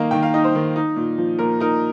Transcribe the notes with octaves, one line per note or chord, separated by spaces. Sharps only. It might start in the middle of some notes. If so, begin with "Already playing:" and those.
Already playing: D#3 A#3 D#4 D#5 F5
D#3 G5
F5
D#4 D#5
C5
D#3
D#4
A#2
F3
A#2 A#4
D#4 A#4